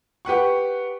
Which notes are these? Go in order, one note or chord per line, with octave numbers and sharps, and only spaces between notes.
G4 B4 F#5 C#6